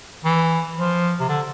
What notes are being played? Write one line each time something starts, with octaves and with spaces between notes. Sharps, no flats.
E3
F3
C3
D3